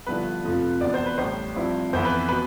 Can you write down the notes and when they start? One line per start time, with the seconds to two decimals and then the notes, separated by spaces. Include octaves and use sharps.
0.07 G2 D3 F3 B3 E4 B4
0.44 F2 C3 F3 A3
0.81 E2 B2 B3 D4 D5
0.94 C5
1.06 B4
1.18 A1 A2 G3 D4 C5
1.56 G2 F3 C4 E4
1.93 F2 E3 B3 E4 C5
2.05 B4
2.29 B2 B4